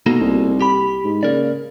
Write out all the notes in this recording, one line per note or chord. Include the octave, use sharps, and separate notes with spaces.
B2 A#3 D#4 A4
C2
G4 B5
G#2
C#3 A#3 A#4 D5